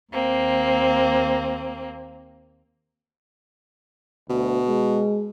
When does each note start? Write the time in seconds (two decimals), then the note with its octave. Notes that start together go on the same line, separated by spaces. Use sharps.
0.12 D#2 A#3 C4
4.29 D2 B2
4.67 G#3